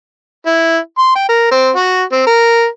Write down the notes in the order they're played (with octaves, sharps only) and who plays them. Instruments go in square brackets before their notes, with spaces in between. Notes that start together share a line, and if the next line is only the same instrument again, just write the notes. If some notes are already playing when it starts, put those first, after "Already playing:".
[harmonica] E4
C6
G5
A#4
C4
F#4
C4
A#4